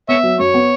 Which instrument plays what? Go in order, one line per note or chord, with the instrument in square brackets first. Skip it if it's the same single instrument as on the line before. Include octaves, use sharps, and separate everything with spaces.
[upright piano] B3 [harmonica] C#5 E5
[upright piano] F#3
[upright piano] F#2 [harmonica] C#5
[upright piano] B3